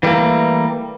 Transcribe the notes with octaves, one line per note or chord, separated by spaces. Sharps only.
E3 G3 A3 A#3